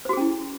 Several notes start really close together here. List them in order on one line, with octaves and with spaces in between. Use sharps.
C5 F#4 G#4 C#4 E4